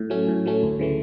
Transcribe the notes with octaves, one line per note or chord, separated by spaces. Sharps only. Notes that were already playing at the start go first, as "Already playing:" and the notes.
Already playing: A2
F#3 A3 C#4
A2
F#3 A3 C#4
D2
C#3 E3 A3